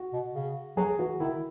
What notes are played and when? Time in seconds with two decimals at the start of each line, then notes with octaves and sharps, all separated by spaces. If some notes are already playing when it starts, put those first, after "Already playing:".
Already playing: F#4
0.13 B2
0.35 C#3
0.77 F#3 G#4
0.99 E3 F#4
1.20 D#3 E4